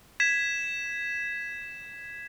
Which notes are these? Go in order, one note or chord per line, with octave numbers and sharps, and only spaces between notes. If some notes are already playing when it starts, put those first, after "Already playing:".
G#6 B6 E7